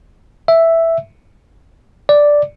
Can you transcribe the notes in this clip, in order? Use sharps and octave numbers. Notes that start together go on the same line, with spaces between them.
E5
D5